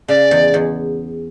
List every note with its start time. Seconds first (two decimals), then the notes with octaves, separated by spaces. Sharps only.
0.08 C#3 D5
0.31 E2
0.54 E2